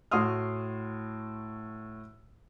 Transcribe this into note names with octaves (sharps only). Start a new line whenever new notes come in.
A2 F#4 C6 D#6 F6